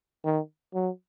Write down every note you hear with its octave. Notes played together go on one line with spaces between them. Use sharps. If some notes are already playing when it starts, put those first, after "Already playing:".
D#3
F#3